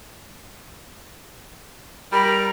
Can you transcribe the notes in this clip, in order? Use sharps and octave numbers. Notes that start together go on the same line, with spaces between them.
G3 A#4 B5